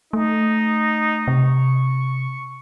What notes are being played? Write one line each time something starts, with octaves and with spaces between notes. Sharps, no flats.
A3 D#4
C3 C#6